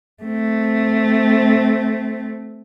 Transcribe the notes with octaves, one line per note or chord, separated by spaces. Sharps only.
A3 C4